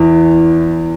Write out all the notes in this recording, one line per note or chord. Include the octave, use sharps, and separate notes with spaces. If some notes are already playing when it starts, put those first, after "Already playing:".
Already playing: E2 E3